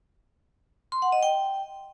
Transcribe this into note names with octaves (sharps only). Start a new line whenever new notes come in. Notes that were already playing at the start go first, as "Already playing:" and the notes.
C6
F#5
D#5
G5